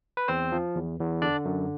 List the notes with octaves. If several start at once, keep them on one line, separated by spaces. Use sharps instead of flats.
B4
E2 C4 C5
F3
E2
E2
D3 D4 D5
F#2